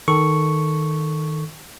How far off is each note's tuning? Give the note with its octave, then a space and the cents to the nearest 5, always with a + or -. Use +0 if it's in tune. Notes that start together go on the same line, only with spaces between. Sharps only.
D#3 +5 A4 +0 C#6 +0